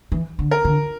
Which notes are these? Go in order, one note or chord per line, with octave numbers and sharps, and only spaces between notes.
E3
D3
A#4
D3